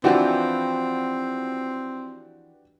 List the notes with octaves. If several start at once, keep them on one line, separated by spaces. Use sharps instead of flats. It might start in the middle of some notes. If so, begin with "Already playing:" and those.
E3 F3 C4 D4 E4 F#4 G4